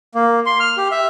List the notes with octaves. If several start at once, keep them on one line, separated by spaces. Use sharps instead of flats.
A#3
C6
F6
G4
E5